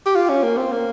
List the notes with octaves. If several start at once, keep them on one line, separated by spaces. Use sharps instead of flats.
G4
F4
C#4
A#3
C4
A#3